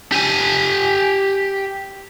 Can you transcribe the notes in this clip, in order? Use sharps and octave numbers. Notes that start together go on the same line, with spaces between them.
G4 G#5